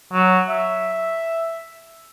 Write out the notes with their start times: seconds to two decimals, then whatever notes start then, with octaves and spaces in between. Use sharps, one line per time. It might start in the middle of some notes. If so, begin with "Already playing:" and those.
0.13 F#3
0.49 E5